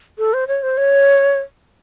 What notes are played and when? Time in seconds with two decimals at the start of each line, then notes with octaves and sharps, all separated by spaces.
0.18 A4
0.34 C5
0.48 C#5
0.63 C5
0.77 C#5